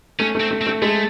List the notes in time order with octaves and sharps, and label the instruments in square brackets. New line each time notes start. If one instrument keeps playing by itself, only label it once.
[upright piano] A3 [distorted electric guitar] C#4
[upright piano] A3
[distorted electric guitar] C4
[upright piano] A3
[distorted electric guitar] C4
[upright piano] A3
[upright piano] G#3 [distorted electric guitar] A3